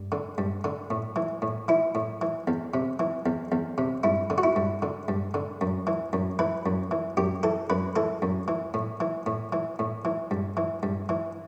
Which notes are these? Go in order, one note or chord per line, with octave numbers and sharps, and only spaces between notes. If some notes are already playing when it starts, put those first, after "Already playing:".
Already playing: G2
D3
G2
D3
A2
E3
A2
E3 E4
A2
E3
E2
C3
E3
E2
E2
C3
G2 E4
D3
F#4
E4
G2
D3
G2
D3
F#2
E3
F#2
E3 B4
F#2
E3
F#2 G4
E3 A4
F#2 B4
E3 A4
F#2
E3
A2
E3
A2
E3
A2
E3
G2
E3
G2
E3